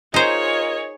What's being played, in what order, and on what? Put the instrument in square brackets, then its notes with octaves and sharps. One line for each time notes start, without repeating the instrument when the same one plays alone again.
[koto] D#4 C5 [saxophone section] F4 A#4 D#5 [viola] G#4 C#5